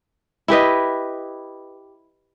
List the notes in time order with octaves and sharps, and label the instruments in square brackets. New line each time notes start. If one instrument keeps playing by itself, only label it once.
[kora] E4 G4 B4 D#5